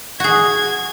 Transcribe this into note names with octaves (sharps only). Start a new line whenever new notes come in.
F#4 G#4 G#6